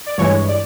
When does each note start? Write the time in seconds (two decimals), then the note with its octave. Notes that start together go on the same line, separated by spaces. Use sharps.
0.06 D5
0.18 G2 E3 G#3 C#5
0.49 D5